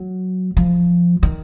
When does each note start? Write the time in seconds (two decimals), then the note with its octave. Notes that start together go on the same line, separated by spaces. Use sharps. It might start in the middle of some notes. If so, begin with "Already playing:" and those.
Already playing: F#3
0.57 F3
1.23 D#3